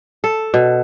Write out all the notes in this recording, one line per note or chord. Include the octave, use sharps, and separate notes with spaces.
A4
B2